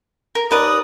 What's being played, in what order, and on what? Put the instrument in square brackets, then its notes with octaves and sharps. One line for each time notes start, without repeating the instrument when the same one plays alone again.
[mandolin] A#4
[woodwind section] D#2 D#6 [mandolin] A#4 B4 D5